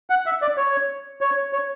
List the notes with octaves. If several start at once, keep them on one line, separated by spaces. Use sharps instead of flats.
F#5
E5
D5
C#5
C#5
C#5